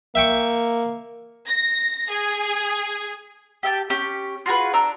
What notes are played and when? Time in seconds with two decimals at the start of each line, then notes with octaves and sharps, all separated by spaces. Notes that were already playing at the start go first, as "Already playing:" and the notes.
0.15 A#3 E5 G5 C#6
1.48 A#6
2.10 G#4
3.63 G4 E5 G5 A5
3.90 C#4 G4
4.46 F4 F#4 G#4 B4
4.73 D4 F#4 A#5 E6